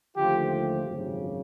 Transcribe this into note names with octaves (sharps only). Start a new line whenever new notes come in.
D#2 D3 F3 A3 F4 G4
G#1 F#2 C#3